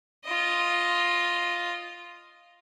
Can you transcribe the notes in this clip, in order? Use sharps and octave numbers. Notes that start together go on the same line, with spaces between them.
F4 D#5